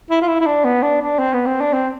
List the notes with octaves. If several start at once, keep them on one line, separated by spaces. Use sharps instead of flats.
E4
F4
E4
E4
D4
B3
D4
D4
C4
B3
C4
D4
C4